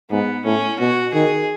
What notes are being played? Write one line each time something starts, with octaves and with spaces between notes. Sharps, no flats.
G#2 B3
A2 C#4
B2 F#4
D#3 G#4